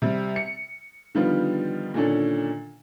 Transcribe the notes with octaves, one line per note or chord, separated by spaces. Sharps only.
C3 G3
C#7
D3 D#3 F3 G3 B3 F4
A#2 D3 D#3 C#4 D4 A4